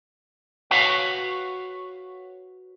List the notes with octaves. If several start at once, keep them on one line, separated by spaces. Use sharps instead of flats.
F#4 B4 C#5 F5 F#5